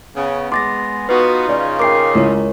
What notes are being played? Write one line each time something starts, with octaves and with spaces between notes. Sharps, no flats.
C#3 B3 C#4
G#3 C6 D6 A6 A#6
B3 D#4 F4 F#4 B4
C#3 C#4 D5
A#4 G5 D6 C7
C#2 E4 A#4 C#5